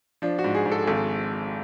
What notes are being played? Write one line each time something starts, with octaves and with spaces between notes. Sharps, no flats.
F3 D4
F#4
G#2
G#4
G#2
A4
G#4
G#1 A4